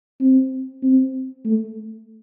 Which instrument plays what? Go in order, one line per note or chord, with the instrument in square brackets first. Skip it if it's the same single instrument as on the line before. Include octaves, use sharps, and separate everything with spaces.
[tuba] C4
C4
A3